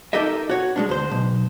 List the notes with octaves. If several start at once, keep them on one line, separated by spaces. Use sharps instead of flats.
D#4 G4 A4 A#4 D#5 E5
F#4 C#5
G#3 C#4 D4
D2 C5
B1